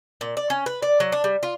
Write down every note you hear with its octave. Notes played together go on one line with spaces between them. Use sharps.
A#2
D5
C#4
B4
D5
F#3
D4
G3
F4